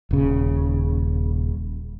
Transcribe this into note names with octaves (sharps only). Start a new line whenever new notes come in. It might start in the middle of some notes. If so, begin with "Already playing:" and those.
D#1 C#3